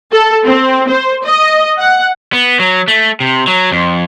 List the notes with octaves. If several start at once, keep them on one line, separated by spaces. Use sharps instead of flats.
A4
C4
C5
D#5
F#5
B3
F#3
A3
C3
F#3
F2